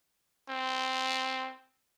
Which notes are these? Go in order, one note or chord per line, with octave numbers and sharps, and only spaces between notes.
C4